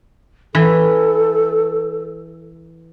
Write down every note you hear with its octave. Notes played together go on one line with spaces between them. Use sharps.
E3 A4